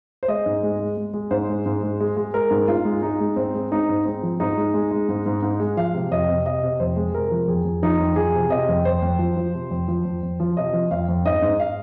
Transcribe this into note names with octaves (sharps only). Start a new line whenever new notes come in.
C5
G#3 D#5
G#2
G#3
G#3
G#3
G#3
G#2 C5
G#3
G#2
G#3
G#3
G#3
G#3 A#4
G#2
G#2 F4
G#3
G#3 D#4
G#3
G#2 C4
G#3
G#3 D#4
G#2
G#3 C4
F3
G#2 D#4
G#3
G#3
G#3
G#2
G#2
G#2
G#3
F3 F5
C3
F2 D#5
C3
C3 D#5
C3
F2 C5
G#3
C3 A#4
F3
F2 G#4
F2
F3 D#4
F2
F3 G#4
C3
C3 D#5
F2
F2 C5
F2
F3
F3
C3
F2
F3
F2
F2
F3
C3 D#5
F3
F2 F5
F2
G#2 D#5
G#2
F5